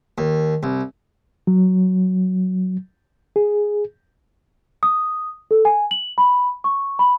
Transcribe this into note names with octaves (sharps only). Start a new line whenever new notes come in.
D#2
C2
F#3
G#4
D#6
A4
G#5
F#7
B5
C#6
B5